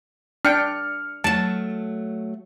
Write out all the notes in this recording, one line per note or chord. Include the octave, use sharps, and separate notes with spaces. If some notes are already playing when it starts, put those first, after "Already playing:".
D4 G5 F6 C#7
F#3 A3 A5